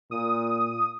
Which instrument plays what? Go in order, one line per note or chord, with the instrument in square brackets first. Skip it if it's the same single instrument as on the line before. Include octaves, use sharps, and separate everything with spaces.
[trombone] A#2 [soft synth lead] D#6